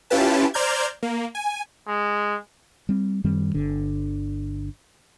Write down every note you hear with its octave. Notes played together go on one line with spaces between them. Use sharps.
C#4 E4 F4 G4 B4 A5
C5 D5 A#5 F6 G6 G#6
A#3
G#5
G#3
G3 C4
F#2 D#3 G3 C4
G1 D3